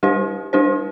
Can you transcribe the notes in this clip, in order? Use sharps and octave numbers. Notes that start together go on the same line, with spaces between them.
G3 D4 G4 C5
G3 D4 G4 C5